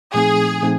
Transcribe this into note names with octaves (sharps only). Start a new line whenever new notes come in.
A#2 F3 A3 C4 D#4 G#4
A#2 F3 A3 C4 D#4